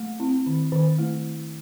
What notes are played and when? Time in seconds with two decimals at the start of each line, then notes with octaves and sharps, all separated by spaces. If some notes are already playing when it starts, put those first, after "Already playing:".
Already playing: A3
0.20 C4 E4
0.46 D#3
0.72 D#3
0.99 A3 E4